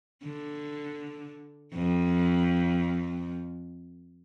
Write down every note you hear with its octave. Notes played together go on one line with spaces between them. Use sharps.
D3
F2